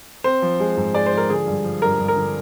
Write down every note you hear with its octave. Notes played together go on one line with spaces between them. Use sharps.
C4 C5
F3
G#3
G#2
G#3 D5
C5
F3
A#4
D3 G#4
G2
F3
G2 A#4
G2
A#4
D3